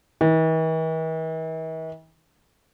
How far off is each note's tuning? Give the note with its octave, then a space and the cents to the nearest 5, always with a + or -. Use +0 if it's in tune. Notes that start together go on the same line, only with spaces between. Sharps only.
E3 -45